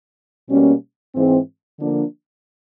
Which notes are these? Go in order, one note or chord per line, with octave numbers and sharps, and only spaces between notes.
B2 G3 A#3 C#4
G#2 E3 G#3 C4
D3 F3 A#3 D4